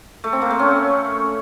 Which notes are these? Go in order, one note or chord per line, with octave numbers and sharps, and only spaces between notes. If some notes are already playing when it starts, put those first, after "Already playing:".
A3
C4
A#3
A3
C#4